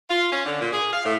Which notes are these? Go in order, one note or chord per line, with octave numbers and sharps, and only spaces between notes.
F4
C#4
D3
A#2
G#4
F5
A2